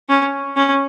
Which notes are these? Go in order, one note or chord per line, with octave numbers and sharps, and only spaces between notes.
C#4
C#4